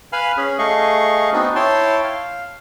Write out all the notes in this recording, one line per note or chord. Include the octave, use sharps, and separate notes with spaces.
B4 F5 G#5 B5 F6
C#4 G#4
A3 G#4 D#5 F5 C#6
B3 C4 D4 D#4 F#4
E4 C#5 G5 A5 C6
F5